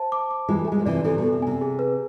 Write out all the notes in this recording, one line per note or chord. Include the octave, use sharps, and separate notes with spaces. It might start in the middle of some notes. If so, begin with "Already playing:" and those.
Already playing: C5 E5 A5
D6
D6
E3 G#3 F4
A3
G#3 G#5
F3
C3 E3 D5
C3 E3 A4
B2
A4
C3
C3 G#5
G#4
B4